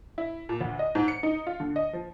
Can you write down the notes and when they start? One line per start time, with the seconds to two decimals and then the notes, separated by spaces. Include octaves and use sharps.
0.18 E4
0.49 A#2
0.61 D2
0.79 D#5
0.95 G#2
1.08 C#7
1.23 D#4
1.47 F4
1.60 D3
1.76 D#5
1.93 F3